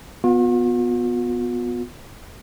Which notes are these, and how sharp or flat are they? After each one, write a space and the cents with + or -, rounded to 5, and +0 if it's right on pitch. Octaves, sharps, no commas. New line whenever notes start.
B3 +0 F4 +45